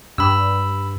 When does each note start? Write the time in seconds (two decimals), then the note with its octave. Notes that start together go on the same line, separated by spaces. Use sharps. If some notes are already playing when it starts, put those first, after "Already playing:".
0.18 G2 B5 E6